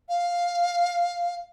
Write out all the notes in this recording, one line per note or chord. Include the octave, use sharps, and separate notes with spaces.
F5